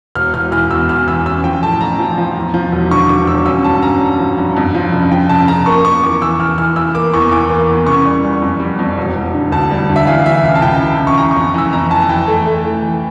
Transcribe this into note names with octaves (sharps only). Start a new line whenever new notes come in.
E1 F6
E1 F6
E3 F6
E2 E6
E2 F6
E3 E6
C#4 E6
F3 G5
A2 A5
A1 A#5
F3
F3
E2
F3
E1
D3 C#6
D3 D6
E1 E6
C#4 E6
G2 A5
C#4 A#5
G2
F3
G2
F2
F3
C#3
F3 G5
C#3 A5
C#3 A#5
A#3 C#6
A#3 C#6
E2 D6
E3 E6
E3 F6
E3 F6
E3 E6
A#3 D6
E2 C#6
E3 D6
A#3
E2
C#3 C#6
G3
G3
F2
G3
F2
E1
E1
D3
D2 A5
G3
D2
E5
E3 F5
F5
E3 E5
C#2 F5
A5
C#2 G5
E3
C#3
C#6
E3 A#5
C#6
F2
E3 E6
F2 A#5
E3 A5
E3 G5
A3
A3
E3
E3